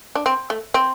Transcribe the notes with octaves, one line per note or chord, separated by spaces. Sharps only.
D4
C4
A3
C4